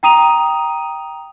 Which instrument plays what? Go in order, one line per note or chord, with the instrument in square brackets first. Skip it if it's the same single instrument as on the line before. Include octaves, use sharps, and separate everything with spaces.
[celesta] G5 A#5 D#6 D#7 F7